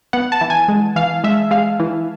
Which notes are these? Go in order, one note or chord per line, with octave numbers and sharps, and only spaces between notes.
B3 F#5
A5
E3
G#5
G#3
E3 F5
G#3 E5
G#3 F5
E3